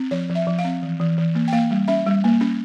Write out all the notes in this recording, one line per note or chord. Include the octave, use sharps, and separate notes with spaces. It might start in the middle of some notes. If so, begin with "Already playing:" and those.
Already playing: C4
F3 C#5
F3
E5
F3
F5
C4
E3
E3
E3
A#3
G5
A#3 F5
G3
C#4 E5
G3
A#3
C#4